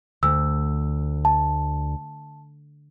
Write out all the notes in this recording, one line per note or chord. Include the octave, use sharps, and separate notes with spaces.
D2 E6
A5